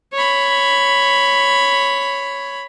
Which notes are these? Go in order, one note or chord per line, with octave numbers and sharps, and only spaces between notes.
C#5 B5